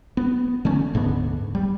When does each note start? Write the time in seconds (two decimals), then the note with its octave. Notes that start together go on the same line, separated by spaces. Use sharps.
0.17 B3
0.65 D3 E3 A3 C#4
0.94 D1 G#2 D3 B3
1.55 G3